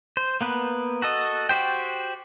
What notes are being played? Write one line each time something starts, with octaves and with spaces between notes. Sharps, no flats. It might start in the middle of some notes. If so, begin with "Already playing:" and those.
C5
A#3 B3 B4
F#4 A4 D#5
F#4 G4 C5 G5